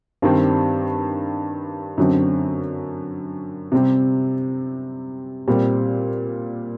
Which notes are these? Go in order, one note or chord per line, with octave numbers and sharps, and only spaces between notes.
G2 D#3 G3 C4
F#2 D3 F#3 C4
C3 G3 C4
A#2 G3 C4